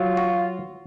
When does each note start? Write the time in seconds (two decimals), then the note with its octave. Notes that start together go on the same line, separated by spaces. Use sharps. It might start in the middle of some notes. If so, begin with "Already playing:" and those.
Already playing: F#3 F4
0.17 F#4